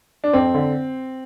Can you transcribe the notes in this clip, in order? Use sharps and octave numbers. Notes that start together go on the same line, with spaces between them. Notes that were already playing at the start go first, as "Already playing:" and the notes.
D4
F2 C4
D3